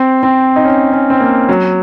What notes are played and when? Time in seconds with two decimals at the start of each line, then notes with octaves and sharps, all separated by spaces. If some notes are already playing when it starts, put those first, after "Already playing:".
Already playing: C4
0.23 C4
0.56 D#4
0.65 C#4
0.92 C#4
1.10 C4
1.20 A#3
1.49 F#3